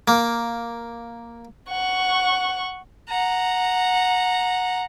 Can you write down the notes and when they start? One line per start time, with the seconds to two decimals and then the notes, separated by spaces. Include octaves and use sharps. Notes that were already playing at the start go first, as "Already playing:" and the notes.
0.08 A#3
1.70 F#5 C#6
3.09 F#5 A#5